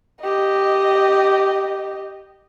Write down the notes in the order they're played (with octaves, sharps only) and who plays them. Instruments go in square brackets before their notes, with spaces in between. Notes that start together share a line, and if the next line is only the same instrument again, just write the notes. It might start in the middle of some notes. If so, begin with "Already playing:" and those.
[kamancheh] G4 D#5